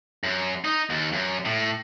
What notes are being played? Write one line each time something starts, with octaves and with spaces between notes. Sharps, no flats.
F#2
D#4
D#2
F#2
A2